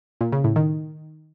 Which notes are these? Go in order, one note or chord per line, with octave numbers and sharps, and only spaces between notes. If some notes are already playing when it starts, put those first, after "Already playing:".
A#2
C#3
A2
D#3